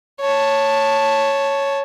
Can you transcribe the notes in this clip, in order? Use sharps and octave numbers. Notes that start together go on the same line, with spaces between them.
C#5 A5